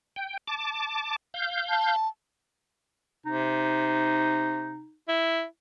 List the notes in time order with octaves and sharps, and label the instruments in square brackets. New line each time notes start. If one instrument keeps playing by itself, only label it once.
[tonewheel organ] G5
A5 D6
F5 G6
[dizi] A5
[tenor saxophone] C3 [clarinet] D#4
[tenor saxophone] E4